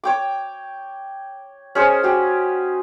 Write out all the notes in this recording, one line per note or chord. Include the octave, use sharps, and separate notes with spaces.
C#5 G5 D6
C#4 G#4 C5 D#5
F#4 G4